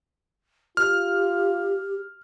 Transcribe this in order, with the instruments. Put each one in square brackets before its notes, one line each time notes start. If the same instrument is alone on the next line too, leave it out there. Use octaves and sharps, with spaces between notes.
[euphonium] F4 [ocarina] G4 [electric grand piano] F6